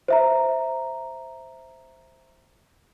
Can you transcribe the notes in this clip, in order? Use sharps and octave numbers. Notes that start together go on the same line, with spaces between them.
C5 E5 A#5